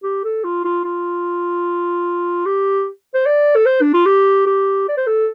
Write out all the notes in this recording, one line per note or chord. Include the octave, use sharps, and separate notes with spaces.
G4
A4
F4
F4
F4
G4
C5
D5
A4
C5
D4
F4
G4
G4
D5
C5
A4